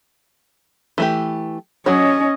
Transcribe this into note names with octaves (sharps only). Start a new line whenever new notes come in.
E3 A3 G4
F#3 C#4 F#4 C#5 D#5